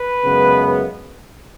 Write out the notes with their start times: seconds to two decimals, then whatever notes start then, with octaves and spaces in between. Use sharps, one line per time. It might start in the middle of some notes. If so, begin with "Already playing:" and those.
Already playing: B4
0.25 F#2 C#3 G#3 B3